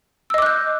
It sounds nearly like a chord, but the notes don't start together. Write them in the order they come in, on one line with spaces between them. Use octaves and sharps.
E6 D#5 D6 F#6 G6